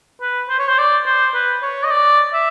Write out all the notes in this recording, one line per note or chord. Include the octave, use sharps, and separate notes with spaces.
B4
C5
C#5
C5
D5
C5
B4
C#5
D#5
D5
E5